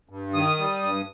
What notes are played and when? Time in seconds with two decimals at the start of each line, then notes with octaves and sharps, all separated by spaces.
0.09 G2
0.34 D#3 D#6
0.58 G3
0.83 G2